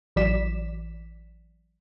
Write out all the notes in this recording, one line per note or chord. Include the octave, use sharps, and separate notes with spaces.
A1 E3 F#3 D5 B6 E7